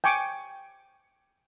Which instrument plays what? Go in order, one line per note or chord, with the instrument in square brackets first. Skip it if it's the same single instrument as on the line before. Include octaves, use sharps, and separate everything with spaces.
[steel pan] G5 G#5 C#6 D6